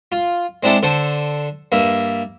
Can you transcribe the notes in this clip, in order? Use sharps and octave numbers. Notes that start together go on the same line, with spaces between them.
F4
G#3 C4 D4 E4 A4
D3 A4 C5
G2 A#3 E5